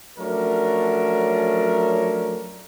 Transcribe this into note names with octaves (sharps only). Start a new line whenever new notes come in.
F3 F#3 A3 C#4 D4 A#4